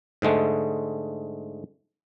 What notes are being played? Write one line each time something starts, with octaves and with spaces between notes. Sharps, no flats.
G#2 D3 G#3 A3